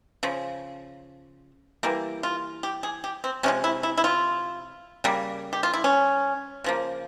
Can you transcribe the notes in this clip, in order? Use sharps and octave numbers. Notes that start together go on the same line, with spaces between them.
C#3 F3
E3 G3 A#3
F4
G4
G#4
G4
C4
C3 F3 G#3 C#4
E4
E4
E4
F4
C#3 G3 A#3
G4
F4
E4
C#4
C#3 F3 A#3